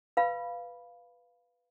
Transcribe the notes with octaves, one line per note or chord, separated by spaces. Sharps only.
B4 F5 B5